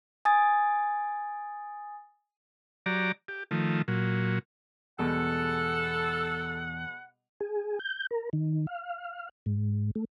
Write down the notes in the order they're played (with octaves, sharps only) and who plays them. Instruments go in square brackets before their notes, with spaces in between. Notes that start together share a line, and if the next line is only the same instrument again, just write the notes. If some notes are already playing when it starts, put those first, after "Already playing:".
[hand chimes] G#5 D#6 A6
[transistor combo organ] F#3 G4 D5 A#5
G4
D#3 F3 A3
A#2 F#3
[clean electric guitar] E2 [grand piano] B2 G3 G#3 [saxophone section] A4 [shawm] F#5
[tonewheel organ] G#4
G6
A#4
D#3
F5
G#2
A3